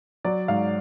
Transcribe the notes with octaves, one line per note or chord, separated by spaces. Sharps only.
F#3 D5
G#2 F5